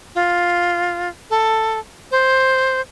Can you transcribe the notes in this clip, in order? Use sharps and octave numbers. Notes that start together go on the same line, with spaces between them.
F4
A4
C5